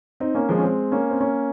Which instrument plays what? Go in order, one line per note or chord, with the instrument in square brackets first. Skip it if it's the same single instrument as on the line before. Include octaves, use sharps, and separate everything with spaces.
[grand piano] C4 D#4
A#3 C#4
F3 G#3
C#4
G#3 C4
A#3 C#4
C4
A#3 C#4